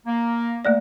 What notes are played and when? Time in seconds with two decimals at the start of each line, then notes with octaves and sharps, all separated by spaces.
0.06 A#3
0.65 A3 A#3 D5